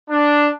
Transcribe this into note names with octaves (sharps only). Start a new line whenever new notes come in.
D4